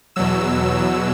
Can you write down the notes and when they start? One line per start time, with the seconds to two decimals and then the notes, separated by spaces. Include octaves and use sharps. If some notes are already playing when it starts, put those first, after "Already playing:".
0.16 E2 B2 F#3 E6
0.78 E6